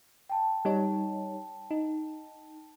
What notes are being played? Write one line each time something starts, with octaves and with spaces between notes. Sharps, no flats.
G5 A5
G3 D#4 C#5
D#4